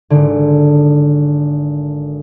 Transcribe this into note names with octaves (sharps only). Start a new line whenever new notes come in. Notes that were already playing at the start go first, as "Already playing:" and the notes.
G#1 D3